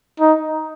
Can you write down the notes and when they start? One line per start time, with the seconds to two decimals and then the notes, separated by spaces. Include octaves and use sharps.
0.20 D#4